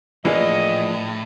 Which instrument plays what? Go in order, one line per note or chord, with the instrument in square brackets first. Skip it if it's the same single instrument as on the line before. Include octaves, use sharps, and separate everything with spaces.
[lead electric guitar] A2 [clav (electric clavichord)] E3 G#3 A#3 [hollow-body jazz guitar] F3 D4 G#4 [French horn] D#5